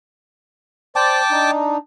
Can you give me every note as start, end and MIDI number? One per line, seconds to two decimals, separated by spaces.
0.96 1.21 72
0.96 1.21 74
0.96 1.51 79
0.96 1.51 81
0.96 1.51 86
1.31 1.77 62
1.31 1.77 63